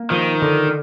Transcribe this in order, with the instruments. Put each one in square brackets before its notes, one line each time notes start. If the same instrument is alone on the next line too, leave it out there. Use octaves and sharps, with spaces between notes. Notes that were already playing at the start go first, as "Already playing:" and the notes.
Already playing: [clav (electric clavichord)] A#3
[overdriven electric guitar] D#3 [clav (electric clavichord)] F3
[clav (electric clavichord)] D3